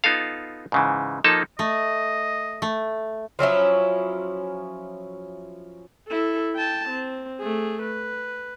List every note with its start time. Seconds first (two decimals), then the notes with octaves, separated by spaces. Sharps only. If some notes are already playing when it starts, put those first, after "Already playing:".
0.04 B3 D#4 F4 A4 F5
0.72 G#2 C#3 E3
1.24 F3 A#3 D#4 A4 A5
1.59 A3 D#5
2.62 A3
3.39 F3 F#3 C#4 E4
6.08 E4 A4
6.56 G5 A5
6.89 C4
7.40 A3 G#4
7.82 B4